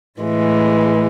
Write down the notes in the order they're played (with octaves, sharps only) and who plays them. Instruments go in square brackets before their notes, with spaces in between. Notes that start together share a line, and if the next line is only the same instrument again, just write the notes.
[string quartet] A2 E3 G#3